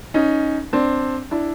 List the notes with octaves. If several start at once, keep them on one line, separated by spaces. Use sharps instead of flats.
C#4 D#4
C4 D4
D4 E4